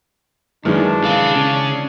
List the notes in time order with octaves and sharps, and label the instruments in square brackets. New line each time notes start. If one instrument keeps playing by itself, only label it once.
[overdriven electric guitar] F#2 [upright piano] D#3 E3 G#3 [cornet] D4
[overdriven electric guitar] G#4 F5
C#3 C#4